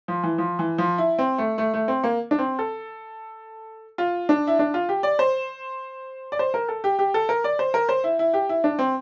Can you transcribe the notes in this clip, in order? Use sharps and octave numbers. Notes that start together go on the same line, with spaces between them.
F3
E3
F3
E3
F3
E4
C4
A3
A3
A3
C4
A#3
D4
C4
A4
F4
D4
E4
D4
F4
G4
D5
C5
D5
C5
A#4
A4
G4
G4
A4
A#4
D5
C5
A#4
C5
E4
E4
G4
E4
D4
C4